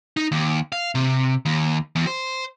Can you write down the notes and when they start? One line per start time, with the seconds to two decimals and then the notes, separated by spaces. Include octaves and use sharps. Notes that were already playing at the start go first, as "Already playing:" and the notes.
0.17 D#4
0.32 D#2
0.72 F5
0.95 C3
1.46 D#2
1.96 E2
2.07 C5